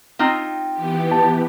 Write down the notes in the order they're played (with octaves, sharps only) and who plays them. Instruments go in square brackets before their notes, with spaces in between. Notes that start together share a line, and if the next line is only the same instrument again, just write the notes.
[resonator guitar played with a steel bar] C4 D#4 F4
[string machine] E3 B3 G4
[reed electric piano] A5